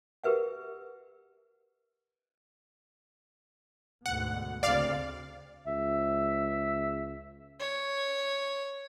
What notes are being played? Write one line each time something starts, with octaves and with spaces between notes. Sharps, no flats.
G4 A#4 B4 E5 F#5
D2 G#2 B2 F#5
D2 C#3 C4 D5 F5
C#2 E5
C#5